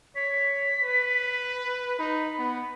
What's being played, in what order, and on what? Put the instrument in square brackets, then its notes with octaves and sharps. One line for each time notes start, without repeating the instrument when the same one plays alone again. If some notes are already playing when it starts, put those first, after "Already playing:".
[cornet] C#5 [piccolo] B6
[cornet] B4
[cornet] D#4 [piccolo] B5
[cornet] B3